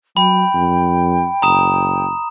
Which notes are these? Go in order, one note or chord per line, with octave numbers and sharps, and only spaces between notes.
F#3 G5 B5
F2
F#1 A#5 D#6 E7